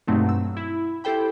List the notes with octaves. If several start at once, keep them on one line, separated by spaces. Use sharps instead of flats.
G2 B2 F#3 A3 C4 D#4
E6
E4
E4 G4 A4 C5 G5 B5